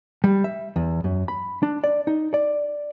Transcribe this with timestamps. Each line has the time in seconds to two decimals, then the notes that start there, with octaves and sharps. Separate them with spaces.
0.24 G3
0.44 E5
0.76 E2
1.04 F#2
1.28 B5
1.63 D4
1.84 D5
2.07 D#4
2.34 D5